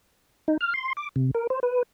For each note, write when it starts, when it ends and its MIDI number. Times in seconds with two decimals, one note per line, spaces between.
0.48 0.57 63
0.61 0.74 89
0.74 0.93 84
0.97 1.09 86
1.16 1.31 48
1.35 1.47 70
1.50 1.60 72
1.63 1.83 71